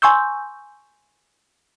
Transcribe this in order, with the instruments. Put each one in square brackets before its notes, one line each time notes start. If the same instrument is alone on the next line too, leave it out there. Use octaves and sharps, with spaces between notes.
[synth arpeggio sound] G#5 C6 C#6 E6 G6